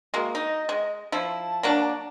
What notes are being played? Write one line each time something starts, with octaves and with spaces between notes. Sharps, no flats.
G#3 A#3 F#4
D#4 D#5
G#3
F3 E4 A5
F#3 A#3 D4